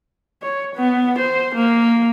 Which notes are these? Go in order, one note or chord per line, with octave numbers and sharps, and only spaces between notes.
C#5
B3
C5
A#3